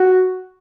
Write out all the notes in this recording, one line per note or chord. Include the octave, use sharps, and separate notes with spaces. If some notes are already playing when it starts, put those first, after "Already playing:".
Already playing: F#4